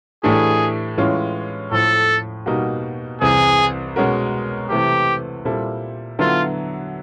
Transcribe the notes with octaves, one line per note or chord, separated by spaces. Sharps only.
A2 E3 A3 D4 G4 G#4
A2 E3 G#3 C#4 F4
A2 F3 A3 A4
B2 G3 A#3 D#4 F#4
C2 C3 E3 G#4
B2 G#3 C#4 F#4 A#4
C3 E3 A3 G4
A#2 G3 C4 E4 A4
D3 F#3 B3 E4 F4 A4